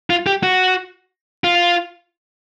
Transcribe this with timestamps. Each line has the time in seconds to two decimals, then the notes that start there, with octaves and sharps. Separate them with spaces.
0.10 F4
0.27 G4
0.43 F#4
1.44 F4